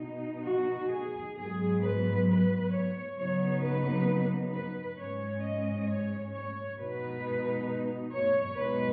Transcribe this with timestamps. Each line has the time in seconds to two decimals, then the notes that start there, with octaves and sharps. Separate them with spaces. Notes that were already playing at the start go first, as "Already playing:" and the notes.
Already playing: B2 B3 D#4
0.46 F#4
0.91 G#4
1.36 G#2 F#3 B3 G#4
1.82 B4
2.27 B4
2.71 C#5
3.17 C#3 F#3 B3 D#4 C#5
3.62 B4
4.52 B4
4.97 G#2 G#3 C#4 C#5
5.42 D#5
5.87 C#5
6.32 C#5
6.77 B2 G#3 B3 D#4 B4
8.13 C#5
8.58 B2 G#3 B3 D#4 B4